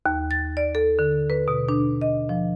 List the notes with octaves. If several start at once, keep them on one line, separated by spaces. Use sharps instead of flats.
D#2
A6
D5
A4
D3
B4
B2
D4
D#5
F3